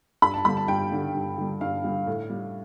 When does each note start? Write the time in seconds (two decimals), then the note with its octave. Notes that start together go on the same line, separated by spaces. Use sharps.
0.22 G2 B5
0.34 A5
0.45 D3 G3 B5
0.57 A5
0.68 G2 G5
0.92 D3 G3
1.15 G2
1.38 D3 G3
1.61 G2 F5
1.84 D3 G3
2.07 A2
2.30 G3